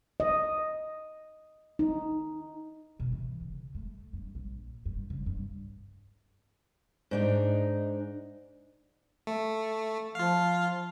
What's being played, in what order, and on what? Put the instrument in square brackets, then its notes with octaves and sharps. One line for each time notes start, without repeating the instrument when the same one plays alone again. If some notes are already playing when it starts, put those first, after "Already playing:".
[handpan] D#5
D#4
[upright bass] B2
E3
C#3
A3
G2
A#1
G2
C#3
G2
[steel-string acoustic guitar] G#2 D4 D#4
[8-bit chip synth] A3
[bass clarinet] F3 [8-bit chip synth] F4 F5